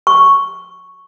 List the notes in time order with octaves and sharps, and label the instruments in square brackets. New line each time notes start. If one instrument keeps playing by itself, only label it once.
[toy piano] C#6